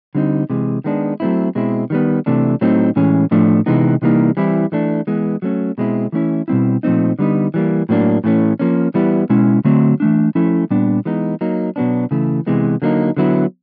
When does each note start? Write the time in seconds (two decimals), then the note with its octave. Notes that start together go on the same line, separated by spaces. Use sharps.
0.15 D3 G3 C4 D#4
0.50 C3 E3 G#3
0.84 D#3 G#3 B3 D4
1.20 F#3 A3 C4 E4
1.55 B2 G#3 C4 E4
1.90 D#3 G3 B3
2.26 C3 E3 A3 D4
2.61 A2 F#3 A3 C4 D#4
2.96 A2 E3 G#3 C#4
3.31 A2 F3 A3 D4
3.66 C3 E3 G#3 B3 D#4
4.02 C3 E3 G3 A#3 D#4
4.37 E3 G3 C4 E4
4.72 E3 A3 D4
5.07 E3 G#3 B3
5.42 F#3 A3 C#4
5.78 B2 G#3 C4 E4
6.12 E3 A3 C#4 E4
6.48 B2 G3 C4 E4
6.83 A#2 F3 A3 C4 D#4
7.19 D3 G3 B3 D#4
7.54 E3 G3 A#3
7.89 A2 F#3 A#3 D4
8.24 A2 E3 A3 C#4
8.59 F3 A#3 C#4
8.94 E3 G3 B3 E4
9.29 B2 G#3 C#4 E4
9.65 D3 F#3 A3 C4
10.00 E3 A3 D4
10.35 F3 A3 C#4 E4
10.70 A#2 G3 B3 D4
11.05 E3 G#3 B3 D#4
11.41 F#3 A#3 D#4
11.76 B2 F#3 B3 D4
12.11 C#3 E3 A3
12.47 C3 E3 G#3 B3
12.82 D3 F#3 A#3 D#4
13.17 D3 F#3 B3 E4